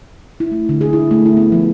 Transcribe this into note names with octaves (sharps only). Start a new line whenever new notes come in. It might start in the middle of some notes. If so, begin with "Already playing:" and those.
E4
A3
D3
G#4
E4
A3
E4
B3
F3